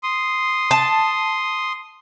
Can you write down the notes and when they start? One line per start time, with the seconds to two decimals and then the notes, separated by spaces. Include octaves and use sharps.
0.03 C6 D#6
0.71 A5